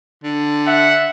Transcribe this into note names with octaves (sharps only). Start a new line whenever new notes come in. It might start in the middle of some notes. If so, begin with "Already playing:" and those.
D3
E5 F#5